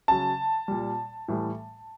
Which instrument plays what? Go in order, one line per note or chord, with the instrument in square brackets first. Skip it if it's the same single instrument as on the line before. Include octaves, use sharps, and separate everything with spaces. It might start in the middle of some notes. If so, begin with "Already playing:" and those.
[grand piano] C#3 F#3 A5
A#2 G3
A2 E3 G3